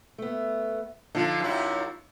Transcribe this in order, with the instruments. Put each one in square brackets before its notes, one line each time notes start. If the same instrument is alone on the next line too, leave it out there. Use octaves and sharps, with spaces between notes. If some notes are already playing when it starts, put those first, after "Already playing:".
[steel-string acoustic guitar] A3 B3
[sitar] D3 F3 [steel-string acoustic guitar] D#4 F4
[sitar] F#2 C3 E4